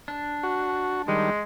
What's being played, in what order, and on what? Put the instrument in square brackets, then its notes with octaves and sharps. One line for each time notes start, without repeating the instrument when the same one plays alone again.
[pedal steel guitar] D4
[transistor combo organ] F#4
[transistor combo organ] D#3 G3 [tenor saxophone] G#3